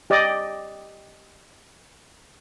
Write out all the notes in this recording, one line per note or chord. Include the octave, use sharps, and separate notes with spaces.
G4 D5 D#5